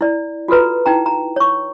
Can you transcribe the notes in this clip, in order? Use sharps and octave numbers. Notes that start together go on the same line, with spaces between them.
E4 D5
F4 F#4 A4 B4 A#5
D#4 E4 G5 A#5
A#5
C#5 C#6